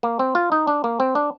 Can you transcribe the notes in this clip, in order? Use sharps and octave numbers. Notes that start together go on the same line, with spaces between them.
A#3
C4
F4
D#4
D4
A#3
C4
D4